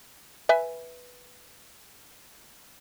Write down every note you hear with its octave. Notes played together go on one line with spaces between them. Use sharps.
B4 E5 G#5